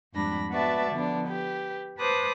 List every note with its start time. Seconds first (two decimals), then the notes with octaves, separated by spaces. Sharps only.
0.13 F2 G#2 G3 D4 B5 A#6
0.49 B3 F#4 B4 D5 E5 A5
0.91 D3 F3 B3 D4
1.25 G4 B4
1.99 B4 C5 A5 D6 D#6 F#6